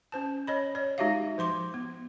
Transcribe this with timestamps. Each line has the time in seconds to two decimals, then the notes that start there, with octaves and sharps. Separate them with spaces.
0.12 C#4 C5 A5
0.47 C#5 D#5 B5
0.75 C#5 D5
0.98 G#3 D#4 F#4 G4 E5 F5
1.38 F3 C5 C6 D6
1.74 B3